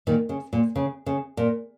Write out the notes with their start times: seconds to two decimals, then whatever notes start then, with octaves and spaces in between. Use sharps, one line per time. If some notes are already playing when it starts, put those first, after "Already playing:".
0.07 A#2 D#3
0.29 C#3
0.53 A#2
0.76 C#3
1.06 C#3
1.37 A#2